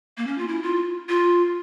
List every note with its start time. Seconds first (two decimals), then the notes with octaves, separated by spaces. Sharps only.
0.18 A#3
0.27 C#4
0.38 F4
0.48 E4
0.63 F4
1.09 F4